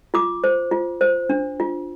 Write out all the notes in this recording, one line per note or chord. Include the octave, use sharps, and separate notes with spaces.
F4 D6
C5
F4
C5
D4
F4